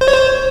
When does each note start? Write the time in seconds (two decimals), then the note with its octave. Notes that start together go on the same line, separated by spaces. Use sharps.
0.01 C5
0.08 C#5
0.14 C5